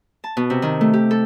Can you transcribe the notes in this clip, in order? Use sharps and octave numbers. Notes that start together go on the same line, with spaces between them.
A5
B2
C3
D#3
A3
G4
A4